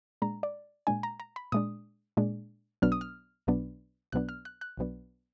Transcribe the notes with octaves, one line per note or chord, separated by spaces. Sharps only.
A#2 G#3 D4 A#5
D5
A#2 G#3 D4 G#5
A#5
A#5
B5
A#2 G#3 D4 D#6
A#2 G#3 D4
B1 B2 F#3 B3 D4 F6
D#6
F6
B1 B2 F#3 B3 D4
B1 B2 F#3 B3 D4 F#6
F6
F#6
F#6
B1 B2 F#3 B3 D4